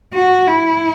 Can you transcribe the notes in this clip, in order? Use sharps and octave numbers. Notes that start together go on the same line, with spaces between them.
F#4
E4